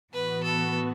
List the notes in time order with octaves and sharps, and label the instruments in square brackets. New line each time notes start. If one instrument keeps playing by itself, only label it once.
[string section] A2 E3 B3 F#4 [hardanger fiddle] B4
[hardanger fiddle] A4